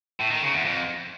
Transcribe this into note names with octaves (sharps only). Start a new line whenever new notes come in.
A2
D#3
C#3
E2
F2